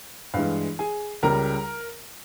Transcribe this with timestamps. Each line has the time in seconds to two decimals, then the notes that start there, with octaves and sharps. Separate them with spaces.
0.34 G2 E3 G#3 F5
0.79 G#4 G#5
1.23 C#2 C#3 G3 A#4 A#5